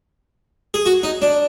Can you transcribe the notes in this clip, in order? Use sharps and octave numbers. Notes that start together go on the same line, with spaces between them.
G#4
F#4
D#4
D4